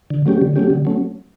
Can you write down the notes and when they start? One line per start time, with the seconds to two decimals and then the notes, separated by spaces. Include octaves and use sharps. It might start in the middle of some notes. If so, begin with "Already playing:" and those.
0.10 D3
0.26 F#3 A3 C#4 G4
0.41 D3
0.56 F#3 A3 C#4 G4
0.70 D3
0.85 F#3 A3 C#4